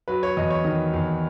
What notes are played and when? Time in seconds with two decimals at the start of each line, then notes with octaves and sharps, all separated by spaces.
0.08 F#3 B4
0.23 C#5
0.37 E2 D#5
0.51 C#5
0.64 D#3 D#5
0.94 E2